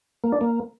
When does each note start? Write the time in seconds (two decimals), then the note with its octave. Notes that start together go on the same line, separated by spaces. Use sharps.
0.24 A#3
0.32 D4
0.41 A#3